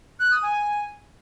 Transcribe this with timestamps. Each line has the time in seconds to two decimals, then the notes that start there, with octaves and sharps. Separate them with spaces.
0.20 F#6
0.31 D#6
0.43 G#5